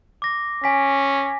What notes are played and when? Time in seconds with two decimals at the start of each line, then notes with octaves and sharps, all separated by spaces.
0.22 D6 A#6
0.64 C#4 G#5 B6